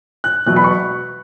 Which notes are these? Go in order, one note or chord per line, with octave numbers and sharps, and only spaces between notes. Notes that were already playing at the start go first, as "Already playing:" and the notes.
F#6
E1 E2 B2 F#3 F#6
B5
C#6